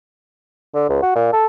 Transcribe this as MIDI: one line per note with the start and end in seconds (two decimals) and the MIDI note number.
0.74 0.87 50
0.89 0.99 37
1.02 1.13 66
1.15 1.31 46
1.33 1.47 69